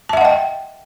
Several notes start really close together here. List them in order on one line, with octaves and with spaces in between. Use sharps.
A5 E5 F#5 D#5 G5